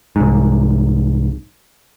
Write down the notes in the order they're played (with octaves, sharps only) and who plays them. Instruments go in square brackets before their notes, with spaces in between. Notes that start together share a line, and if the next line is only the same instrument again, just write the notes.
[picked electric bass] C2 G#2